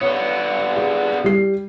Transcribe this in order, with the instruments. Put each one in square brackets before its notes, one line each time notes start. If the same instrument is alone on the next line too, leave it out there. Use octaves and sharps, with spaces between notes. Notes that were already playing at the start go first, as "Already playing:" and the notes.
[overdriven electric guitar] D3 B3 [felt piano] C#5
[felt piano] G#4
G3 C7